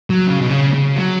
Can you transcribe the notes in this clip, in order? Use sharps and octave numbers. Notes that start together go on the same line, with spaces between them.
F#3
C#3
B2
C#3
C#3
F#3